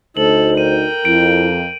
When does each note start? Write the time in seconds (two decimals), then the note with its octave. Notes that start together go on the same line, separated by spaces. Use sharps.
0.17 D2 D#4 A4 C5 F#7
0.57 A#4 G5 D#7
1.05 F2 E4 D7